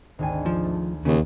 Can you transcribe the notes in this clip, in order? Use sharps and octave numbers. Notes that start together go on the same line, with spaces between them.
G#1 D2 G#5
F3
A3
D#2 C#3